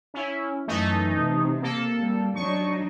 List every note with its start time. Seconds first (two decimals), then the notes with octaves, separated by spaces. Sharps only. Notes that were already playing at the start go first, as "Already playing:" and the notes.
0.14 C#4 E4
0.68 F#2 E3 A3 D#4 A4
1.19 C3
1.62 A#3 A4
2.00 G3
2.35 F#3 D4 D#4 C#6